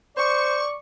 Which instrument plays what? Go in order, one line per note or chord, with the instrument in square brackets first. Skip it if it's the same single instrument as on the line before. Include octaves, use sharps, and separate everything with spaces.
[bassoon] C5 [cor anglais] D5 [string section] C#6